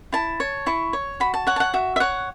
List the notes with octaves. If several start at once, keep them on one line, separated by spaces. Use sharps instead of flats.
E4 A5
C#5
E4 C#6
C#5
F#4 B5
A5
C#5 F#5
A5
F#5
F#4 E5
E5
C#5 F#5